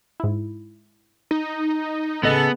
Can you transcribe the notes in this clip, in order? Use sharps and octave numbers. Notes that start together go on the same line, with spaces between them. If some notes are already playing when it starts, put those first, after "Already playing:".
G#2 E4
D#4
A1 C#3 B3 G#4 A4 D#5 A5